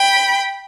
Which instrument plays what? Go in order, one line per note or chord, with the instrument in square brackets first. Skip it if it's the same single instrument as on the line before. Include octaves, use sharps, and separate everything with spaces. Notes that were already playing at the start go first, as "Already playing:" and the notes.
Already playing: [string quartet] G5 B5